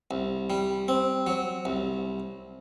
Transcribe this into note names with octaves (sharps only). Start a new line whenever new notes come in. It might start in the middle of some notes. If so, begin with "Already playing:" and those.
C2
G3
C4
F#3
C2